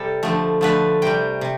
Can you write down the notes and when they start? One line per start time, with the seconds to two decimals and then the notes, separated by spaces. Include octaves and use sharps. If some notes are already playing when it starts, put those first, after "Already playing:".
Already playing: C3 G3 A4
0.23 D3 F3 A3
0.61 D3 F3 A3 B4
1.02 C3 G3 G5
1.41 C3